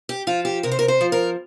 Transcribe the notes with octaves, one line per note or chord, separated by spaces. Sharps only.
G4
F3 F4
G4
C3 A#4
C5
A#4
C5
F3
A#4